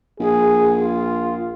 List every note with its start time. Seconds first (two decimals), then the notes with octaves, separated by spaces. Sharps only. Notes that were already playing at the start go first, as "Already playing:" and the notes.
0.20 A#1 G#4
0.80 F4